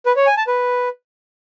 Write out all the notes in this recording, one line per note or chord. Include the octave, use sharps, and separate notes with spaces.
B4
C#5
G#5
A5
B4